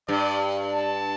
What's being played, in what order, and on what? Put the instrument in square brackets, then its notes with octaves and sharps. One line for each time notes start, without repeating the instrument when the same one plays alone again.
[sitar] G2 [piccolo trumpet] D5
[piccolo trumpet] A5